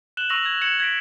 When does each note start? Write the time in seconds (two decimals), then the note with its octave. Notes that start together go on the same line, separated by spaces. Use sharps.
0.17 F#6 E7 F#7 G7
0.29 C#6 E6 A#6 F7 F#7
0.46 G#6
0.61 C#6 G#6 C#7 E7 F#7
0.80 G#6 A#6 B6 D7